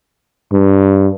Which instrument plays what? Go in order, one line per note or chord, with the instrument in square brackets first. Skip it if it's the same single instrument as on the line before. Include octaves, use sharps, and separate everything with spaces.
[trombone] G2